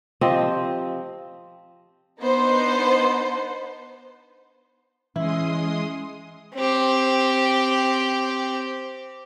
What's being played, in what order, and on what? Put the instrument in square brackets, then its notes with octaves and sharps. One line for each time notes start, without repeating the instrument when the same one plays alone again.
[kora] F3 C4 G4 D#5
[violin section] B3 D4 D#4 B4 C5
[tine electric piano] E3 [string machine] G#3 C6 D#6 [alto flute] C#4 [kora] E4
[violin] C4 G4